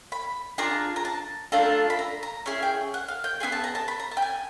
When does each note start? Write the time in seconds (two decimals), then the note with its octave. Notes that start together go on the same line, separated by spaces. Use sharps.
0.12 B5
0.58 D4 F4 G#4 A#5
0.96 A#5
1.05 A5
1.52 A3 D4 F4 A4 A#5
1.90 B5
1.99 A#5
2.23 A#5
2.46 C#4 E4 G#4
2.63 G5
2.94 F#5
3.08 F5
3.24 G5
3.40 B3 E4 G#4 G#5
3.52 A5
3.64 A#5
3.75 A5
3.88 B5
4.00 A#5
4.11 A5
4.17 G5
4.22 G#5